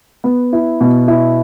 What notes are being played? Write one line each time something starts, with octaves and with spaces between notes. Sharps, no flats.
B3
E4
B2
E4